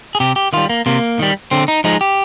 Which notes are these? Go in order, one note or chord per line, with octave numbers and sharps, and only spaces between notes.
G#4
C3 G4
G4
D#3 G3 F4
A#3
C3 A#3
D#3 G3
D3 C4
D#4
F3 G#3 D#4
G4